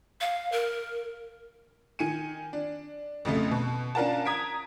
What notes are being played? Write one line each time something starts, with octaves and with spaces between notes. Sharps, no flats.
F5
A#4
D#3 G#5 C#7 D#7
D4
A1 F2 C#3 A3
B2
C#4 D4 F4 A#4 F#5 A5
A#5 D#6 G#6 B6 D7